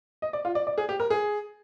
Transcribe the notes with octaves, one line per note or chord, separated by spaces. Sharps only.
D#5
D5
F4
D5
D5
G#4
G4
A#4
G#4